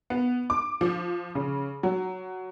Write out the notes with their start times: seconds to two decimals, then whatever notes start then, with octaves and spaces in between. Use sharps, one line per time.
0.10 B3
0.50 D6
0.81 F3
1.35 C#3
1.83 F#3